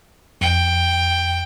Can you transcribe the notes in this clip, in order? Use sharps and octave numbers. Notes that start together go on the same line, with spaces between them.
F2 G5